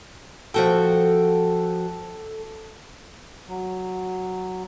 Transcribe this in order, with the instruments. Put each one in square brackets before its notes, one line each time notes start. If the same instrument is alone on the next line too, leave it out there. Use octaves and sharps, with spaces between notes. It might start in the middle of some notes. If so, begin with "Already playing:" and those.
[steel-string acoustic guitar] F3 F#4 G5 [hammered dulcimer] A4
[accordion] F#3